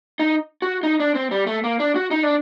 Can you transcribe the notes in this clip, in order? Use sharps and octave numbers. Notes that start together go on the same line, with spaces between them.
D#4
F#4
D#4
D4
C4
G3
A3
A#3
D4
F#4
D#4
D4